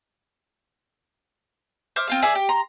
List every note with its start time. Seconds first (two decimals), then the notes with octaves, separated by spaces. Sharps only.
1.96 C5 E5 D6 F6
2.08 C4 F4 F5
2.22 G#4 D5 E5
2.35 G4
2.49 A#5 C6